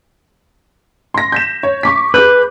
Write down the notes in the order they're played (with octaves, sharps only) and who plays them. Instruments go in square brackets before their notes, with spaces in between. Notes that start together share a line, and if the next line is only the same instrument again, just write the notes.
[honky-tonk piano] C6 A#6
G6 B6 E7
C#5
C#6 D6 B6
[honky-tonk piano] G#4 D6 G6 [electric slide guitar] B4